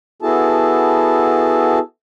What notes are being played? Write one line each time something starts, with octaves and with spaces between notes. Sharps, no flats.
B3 E4 F#4 G#4 A4 A5